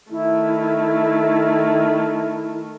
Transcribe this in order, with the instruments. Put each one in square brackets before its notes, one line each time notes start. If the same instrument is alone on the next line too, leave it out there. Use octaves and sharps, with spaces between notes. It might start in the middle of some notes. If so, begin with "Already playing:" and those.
[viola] D#3 A3 [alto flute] E4